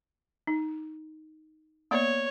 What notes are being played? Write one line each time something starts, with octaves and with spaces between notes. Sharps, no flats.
D#4
A#3 B3 C#5 D5